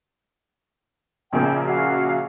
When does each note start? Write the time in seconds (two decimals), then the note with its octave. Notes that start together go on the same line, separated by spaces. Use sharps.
1.33 A#1 C#3 A#3 G5
1.64 F#4 F5